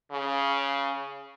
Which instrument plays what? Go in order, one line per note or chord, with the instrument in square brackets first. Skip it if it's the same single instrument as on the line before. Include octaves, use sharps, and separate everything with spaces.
[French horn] C#3